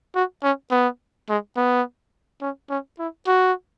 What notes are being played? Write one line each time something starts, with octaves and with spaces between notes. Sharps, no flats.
F#4
C#4
B3
G#3
B3
C#4
C#4
E4
F#4